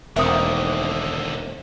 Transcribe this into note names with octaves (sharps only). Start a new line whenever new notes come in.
E1 D3 D#3 A3 A#3 C4 E5 D#6